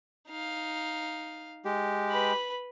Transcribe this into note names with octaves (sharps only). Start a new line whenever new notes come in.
D#4 F5
G#3 G4
B4 B5